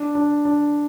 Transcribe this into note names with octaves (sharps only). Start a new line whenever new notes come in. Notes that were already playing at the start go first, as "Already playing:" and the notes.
Already playing: D4
D4
D4